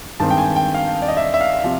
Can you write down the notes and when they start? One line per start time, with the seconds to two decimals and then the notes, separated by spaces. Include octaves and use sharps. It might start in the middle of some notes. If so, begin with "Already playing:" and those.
0.20 G2 D#3 G#3 C4 A5
0.31 G5
0.38 G#5
0.56 G5
0.74 F5
1.02 D5
1.08 D#5
1.17 E5
1.34 E5
1.41 F5
1.64 C3 F3